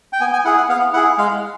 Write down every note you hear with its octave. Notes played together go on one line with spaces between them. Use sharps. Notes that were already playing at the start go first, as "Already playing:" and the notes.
G5
B3 G#5
G#5
E4 G#4 F#5
F#5
B3 F5
E4 G#4 F#5
G#3 F5